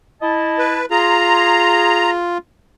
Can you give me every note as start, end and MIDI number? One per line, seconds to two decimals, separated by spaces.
0.22 0.81 64
0.22 0.81 75
0.22 0.81 81
0.58 0.85 71
0.91 2.38 65
0.91 2.18 68
0.91 2.11 82
0.91 2.18 84